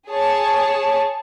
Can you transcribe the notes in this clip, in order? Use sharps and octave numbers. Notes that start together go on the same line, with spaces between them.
G#4 C#5 A5